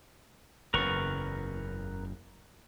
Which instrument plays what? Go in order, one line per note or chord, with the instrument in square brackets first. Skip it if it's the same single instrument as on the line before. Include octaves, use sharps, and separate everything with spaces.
[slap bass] F#1 E2 C#3 [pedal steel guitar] A#4 B4 C#6